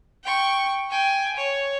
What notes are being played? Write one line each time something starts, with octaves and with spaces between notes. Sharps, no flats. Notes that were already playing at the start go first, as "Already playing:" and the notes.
G5 C#6
G5 G#5
C#5